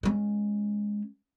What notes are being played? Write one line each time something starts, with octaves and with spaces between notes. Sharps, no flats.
G#3 C#4